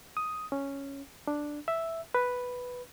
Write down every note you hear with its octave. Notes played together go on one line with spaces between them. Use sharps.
D#6
C#4
D4
E5
B4